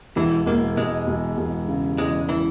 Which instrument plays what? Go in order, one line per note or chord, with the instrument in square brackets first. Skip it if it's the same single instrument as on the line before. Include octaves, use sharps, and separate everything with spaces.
[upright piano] E1 [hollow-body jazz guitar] E3
[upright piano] E1 [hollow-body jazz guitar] A#3
[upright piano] E1 [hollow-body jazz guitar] G#3
[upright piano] E1
E1
C#3
[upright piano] E2 [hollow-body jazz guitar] G#3
[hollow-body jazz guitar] E3